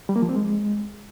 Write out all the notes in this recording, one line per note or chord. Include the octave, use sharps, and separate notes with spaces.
G3
A#3
F3
C4
G#3